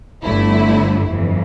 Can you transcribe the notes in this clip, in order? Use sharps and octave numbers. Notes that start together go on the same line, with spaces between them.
G1 G2 D3 A3 E4
G1 F2 E3